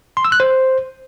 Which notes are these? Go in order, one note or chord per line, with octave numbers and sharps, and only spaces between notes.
C6
E6
F#6
C5